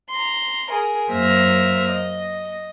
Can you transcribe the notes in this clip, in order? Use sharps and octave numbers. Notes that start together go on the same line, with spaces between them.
A#5 C6
G#4 A#4
F#2 A#3 C5 E5 F6 A#6
D#5